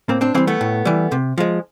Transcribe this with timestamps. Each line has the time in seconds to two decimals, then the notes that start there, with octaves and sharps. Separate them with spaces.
0.08 A2 A#3 C4
0.21 C4 D4
0.34 E3 G3 A#3 C4
0.47 A3 B3
0.61 A2
0.85 E3 G3
1.12 C3
1.38 F3 G#3